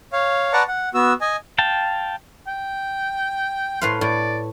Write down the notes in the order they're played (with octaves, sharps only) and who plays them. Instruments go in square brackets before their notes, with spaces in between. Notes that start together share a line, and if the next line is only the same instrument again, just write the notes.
[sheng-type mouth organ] C#5 F5
B4 D5 F#5 A5 A#5 C#6
F#5
B3 F#4 E6
D#5 G#5
[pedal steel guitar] F5 G5 A5
[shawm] G5
[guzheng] A2 B4 F5 [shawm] C6
[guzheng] A2 [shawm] D5